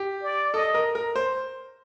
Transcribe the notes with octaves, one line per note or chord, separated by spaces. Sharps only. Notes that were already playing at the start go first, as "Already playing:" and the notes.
Already playing: G4
D5
A4 D#5
A#4
A#4
C5